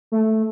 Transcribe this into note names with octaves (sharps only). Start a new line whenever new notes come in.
A3